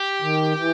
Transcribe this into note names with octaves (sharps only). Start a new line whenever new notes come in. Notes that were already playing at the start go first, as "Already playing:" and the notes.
Already playing: G4
D#3
E3